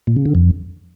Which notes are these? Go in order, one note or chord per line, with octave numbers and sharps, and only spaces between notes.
A#2
C#3
D3
F2